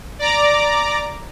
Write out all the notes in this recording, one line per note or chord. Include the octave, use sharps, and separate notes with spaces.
D5 A#5 D6